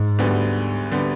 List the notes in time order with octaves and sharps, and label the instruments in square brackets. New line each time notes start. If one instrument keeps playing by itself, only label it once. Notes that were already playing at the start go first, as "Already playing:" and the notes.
Already playing: [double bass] G#2
[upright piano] D2 D3 G3 B3
D3 G3 B3